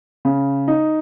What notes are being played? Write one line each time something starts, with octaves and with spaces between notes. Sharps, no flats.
C#3
D#4